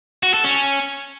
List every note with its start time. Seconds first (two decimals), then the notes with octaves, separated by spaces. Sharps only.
0.23 F#4
0.34 A4
0.45 C#4